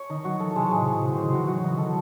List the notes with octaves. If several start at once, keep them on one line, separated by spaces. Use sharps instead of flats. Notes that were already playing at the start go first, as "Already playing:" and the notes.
Already playing: C#5
D#3 D#4
F#3 F#4
E3 A4
C3 G#3
A2 G#3
C3
A2 G#3
C3 C5
C#3 C5
D#3
E3 F#4
F#3 F#4
E3 D#4
D#3
A4
E3